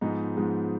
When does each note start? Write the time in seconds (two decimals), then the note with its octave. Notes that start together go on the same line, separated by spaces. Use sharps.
0.01 G#2 F3 G#3 B3 D#4
0.37 G#2 F3 G#3 B3